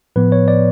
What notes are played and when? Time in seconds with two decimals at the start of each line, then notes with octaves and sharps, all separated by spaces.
0.16 A2 F3 B3 B4
0.32 C#5
0.48 D5